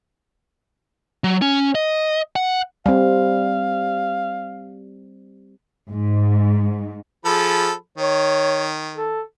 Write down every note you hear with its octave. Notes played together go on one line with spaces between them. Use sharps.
F#3
C#4
D#5
F#5
G3 C4 F5
G#2
F3 G#4 A4 B5
D#3 C#5
A4